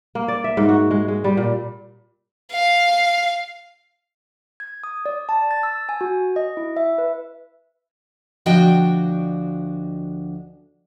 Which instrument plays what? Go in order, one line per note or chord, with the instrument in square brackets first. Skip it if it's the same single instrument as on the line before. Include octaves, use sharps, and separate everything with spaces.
[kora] A#3
D5
E5
G#2
F#4
G#3
G#3
G3
A#2
[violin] F5
[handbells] G#6
D#6
D5
A5
A6
E6
G#5
F#4
D#5
E4
E5
B4
[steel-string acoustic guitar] D2 F3 D4 F#4 D#5 G5